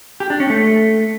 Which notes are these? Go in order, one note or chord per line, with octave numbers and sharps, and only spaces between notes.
G4
D4
C#4
A3